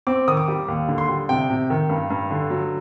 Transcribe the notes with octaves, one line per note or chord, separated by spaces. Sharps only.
C4 D6
D#3 D#6
D6
G3
D#2
D3
C6
G3
C3 G5
C3
D#3
G2
G2
D3
F#3